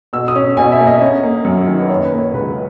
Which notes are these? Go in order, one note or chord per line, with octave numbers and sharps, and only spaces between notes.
B2 E6
D#6
C#4
B2 G#5
E5
A#3
D#5
C#4
A#3
F#2
D#3
B4
C#4 C#5
B4
A#3
C#5
C#2 B4